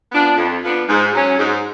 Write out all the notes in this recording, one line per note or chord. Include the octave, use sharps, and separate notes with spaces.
F3 B3 D4
F2
F3 B3 D4
G#2
F#3 C#4
G#2